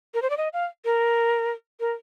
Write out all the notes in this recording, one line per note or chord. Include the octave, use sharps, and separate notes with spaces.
A#4
C5
D5
D#5
F5
A#4
A#4